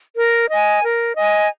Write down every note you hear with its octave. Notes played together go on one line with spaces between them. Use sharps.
A#4
D#5 G#5
A#4
D#5 G#5